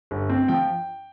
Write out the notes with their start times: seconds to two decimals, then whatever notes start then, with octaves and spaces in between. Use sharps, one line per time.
0.11 G1
0.30 C4
0.48 F3 G5